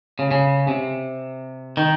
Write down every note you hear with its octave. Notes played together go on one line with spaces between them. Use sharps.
C#3
C#3
C3
D#3